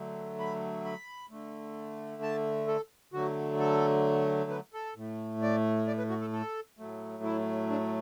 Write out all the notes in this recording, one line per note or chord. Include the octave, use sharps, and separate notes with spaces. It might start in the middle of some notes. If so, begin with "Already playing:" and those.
Already playing: D3 F#3 A3
B5
B5
D3 A3
A5
A4
D3 F#3 A3 F#4
A4
B4
A4
A2 A3
D5
D5
B4
F#4
A4
A4
A2 F#3 A3
E4
D4